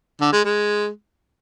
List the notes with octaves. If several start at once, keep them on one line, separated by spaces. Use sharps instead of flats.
D3
G#3
G#3